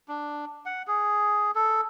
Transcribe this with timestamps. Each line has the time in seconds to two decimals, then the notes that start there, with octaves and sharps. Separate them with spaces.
0.08 D4
0.66 F#5
0.87 G#4
1.55 A4